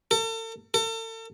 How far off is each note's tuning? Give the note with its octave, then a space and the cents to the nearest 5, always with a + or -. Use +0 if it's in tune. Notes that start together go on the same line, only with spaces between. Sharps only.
A4 +40
A4 +40